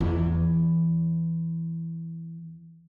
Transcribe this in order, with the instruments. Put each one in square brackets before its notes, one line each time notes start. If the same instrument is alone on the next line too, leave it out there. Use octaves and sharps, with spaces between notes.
[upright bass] E2 E3